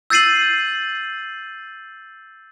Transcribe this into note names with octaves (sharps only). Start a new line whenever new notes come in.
E6 G6 A6 C7 D#7 F#7